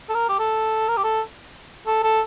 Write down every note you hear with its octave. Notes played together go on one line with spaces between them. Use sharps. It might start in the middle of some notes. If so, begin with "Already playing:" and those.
A4
A#4
G4
A4
A#4
G4
A4
A4
A4